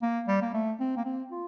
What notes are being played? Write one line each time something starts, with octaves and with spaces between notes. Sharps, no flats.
A#3
G3
A#3
A3
C4
A#3
C4
F4